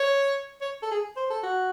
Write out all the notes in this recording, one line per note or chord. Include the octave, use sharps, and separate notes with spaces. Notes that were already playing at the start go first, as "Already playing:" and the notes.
Already playing: C#5
C#5
A4
G#4
C5
A4
F#4